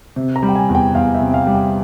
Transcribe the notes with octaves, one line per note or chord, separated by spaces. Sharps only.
C3
A#5
G3
G5
G#5
E2
G5
E2 F5
E5
C3
F5
G3
G5